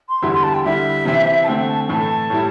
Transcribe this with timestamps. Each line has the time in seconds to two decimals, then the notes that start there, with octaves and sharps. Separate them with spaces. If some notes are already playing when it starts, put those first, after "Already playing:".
0.09 C6
0.22 E2 D3 G3 E4
0.33 C6
0.43 A5
0.54 G5
0.64 D3 G3 E4 E5
1.05 C3 E3 C4 E4
1.43 A5
1.47 D3 A3 C4 G5
1.68 A5
1.81 G5
1.89 A2 E3 A3 A5
2.30 A2 G3 E4